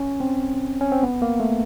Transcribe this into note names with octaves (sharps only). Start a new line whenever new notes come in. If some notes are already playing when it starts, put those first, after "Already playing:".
Already playing: C#4
C4
C#4
C4
B3
A#3
A3